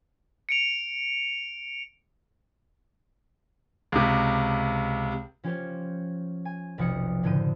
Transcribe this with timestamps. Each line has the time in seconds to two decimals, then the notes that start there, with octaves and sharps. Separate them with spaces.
0.49 C#7 D7 F7
3.92 C#2 C3
5.44 F3 C#4 F4 G4 C5 C#5
6.45 G#5
6.78 F1 B1 F3 G3 D#6 C#7
7.23 F#1 A2 D3 C5 D#7